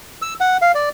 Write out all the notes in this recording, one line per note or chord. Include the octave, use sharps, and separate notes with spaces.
E6
F#5
F5
D5